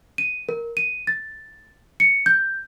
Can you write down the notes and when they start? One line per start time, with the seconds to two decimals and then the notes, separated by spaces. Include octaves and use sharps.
0.18 D#7
0.49 A#4
0.77 D#7
1.07 A6
2.00 C#7
2.26 G6